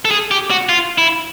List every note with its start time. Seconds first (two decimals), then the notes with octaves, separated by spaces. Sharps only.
0.05 A4
0.11 G#4
0.31 G4
0.51 F#4
0.69 F4
0.98 E4